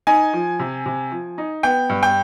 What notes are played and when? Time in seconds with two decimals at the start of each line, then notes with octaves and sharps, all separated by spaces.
0.07 D#4 G#5
0.33 F3
0.59 C3
0.86 C3
1.11 F3
1.38 D#4
1.63 B3 G5
1.89 G2
2.03 G5